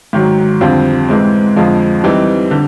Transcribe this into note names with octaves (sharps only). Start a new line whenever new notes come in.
G#2 D#3 F#3
F2 D3 G3 C4 F4
G#2 E3 G#3 C4
F2 D3 F3 G#3
E3 G3 C4 D#4
D3